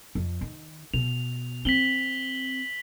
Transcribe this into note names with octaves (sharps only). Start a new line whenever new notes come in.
F2
D#3
B2 F7
C4 B6 F#7 G7